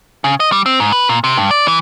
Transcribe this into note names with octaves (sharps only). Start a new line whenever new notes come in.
C#3
D#5
G3
C4
G#2
B4
A#2
C3
G2
D5
E3